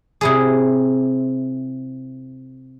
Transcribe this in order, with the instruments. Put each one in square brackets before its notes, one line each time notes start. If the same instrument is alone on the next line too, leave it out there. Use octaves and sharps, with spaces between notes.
[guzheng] C3 E4 G#4